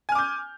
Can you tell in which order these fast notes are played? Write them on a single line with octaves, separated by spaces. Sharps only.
G#5 F6 D6 G6